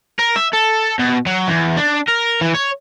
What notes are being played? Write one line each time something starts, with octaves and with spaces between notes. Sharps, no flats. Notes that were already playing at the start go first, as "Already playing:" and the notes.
A#4
E5
A4
B2
F#3
E2
D4
A#4
E3
C#5